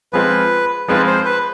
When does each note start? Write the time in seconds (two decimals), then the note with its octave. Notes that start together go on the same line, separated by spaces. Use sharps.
0.13 F3 G#3 C4 F4 B4
0.88 F3 G#3 C4 F4 B4
1.07 C5
1.25 B4